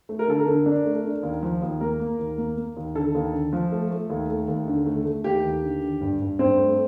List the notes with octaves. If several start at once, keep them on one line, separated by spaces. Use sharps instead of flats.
A3
A#4
D3 A4
A#4
D3
D4
A3
D4
D#2
F3
D#2
A#3 A#4
A#3
D#2
A#3
A#3
D#2
D3 A4
D#2
D3
F3
A3
A3
D#2
A3
D#2
D3
A3
A3
D#2 G4
D#2
D3
D3
G2
G2
G2 C4
A3